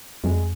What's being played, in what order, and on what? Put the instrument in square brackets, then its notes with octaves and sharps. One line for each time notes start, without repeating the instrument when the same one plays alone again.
[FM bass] F2 [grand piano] G#3